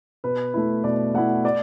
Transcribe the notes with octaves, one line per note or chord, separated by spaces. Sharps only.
B2 B4
A3 E4
B2 D5
A3 E4 F#5
D5